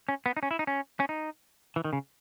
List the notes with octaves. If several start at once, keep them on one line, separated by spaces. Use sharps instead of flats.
C#4
B3
D#4
C#4
E4
D#4
C#4
C#4
D#4
E3
D#3
C#3